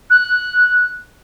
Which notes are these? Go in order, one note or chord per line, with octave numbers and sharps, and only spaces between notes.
F#6